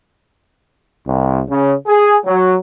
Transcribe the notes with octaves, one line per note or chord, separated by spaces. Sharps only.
C2
C#3
G#4
F#3